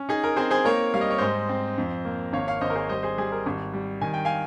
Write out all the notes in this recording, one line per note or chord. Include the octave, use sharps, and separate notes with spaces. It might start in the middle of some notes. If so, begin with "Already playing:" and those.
Already playing: C#4
D#4 G#4
A#4
C4 G#4 C5
G#4 C5
A#3 A#4 C#5
G3 F5
D#5
C#5
G#2 C5 D#5
C4
F2
A#3
G#1 C#5 F5
C#5 F5
G#1 C5 D#5
A#4
G#4 C5
G3 C5 D#5
G#4 C5
G3 G#4
A#4
G#1
G3
D#3 G#5
G5
F5 G#5